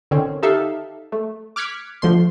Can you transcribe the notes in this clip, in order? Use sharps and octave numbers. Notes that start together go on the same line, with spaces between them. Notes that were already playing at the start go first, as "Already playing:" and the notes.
D3 D#3 C4 C#4
D#4 G4 A4 E5 F5
A3
D6 F6 F#6 G#6 B6 C#7
D3 F3 A3 C6